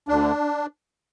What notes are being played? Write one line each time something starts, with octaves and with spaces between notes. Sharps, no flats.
D2 D3 D4